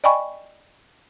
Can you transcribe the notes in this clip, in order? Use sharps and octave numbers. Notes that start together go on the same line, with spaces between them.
D5 D#5 G5 G#5 B5 C#6